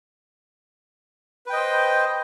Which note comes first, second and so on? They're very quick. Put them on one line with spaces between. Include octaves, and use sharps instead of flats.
B4 G5 D#5 C5